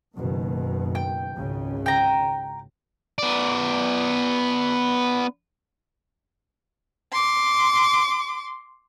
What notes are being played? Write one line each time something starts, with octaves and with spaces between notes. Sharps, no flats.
F#1 B2 D#3
G5
G#1 C#2 C#3
G5 A#5
B3 D5
C6 D6